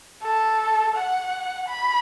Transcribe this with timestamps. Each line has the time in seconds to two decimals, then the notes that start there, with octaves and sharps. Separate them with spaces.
0.22 A4
0.95 F#5
1.68 B5